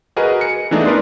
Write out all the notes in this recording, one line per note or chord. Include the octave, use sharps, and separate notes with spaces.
F#4 G#4 A#4 B4 D#5
C#7
E3 A3 B3 D4 D#4 G#4
A#4 B4 D5 C6 D#6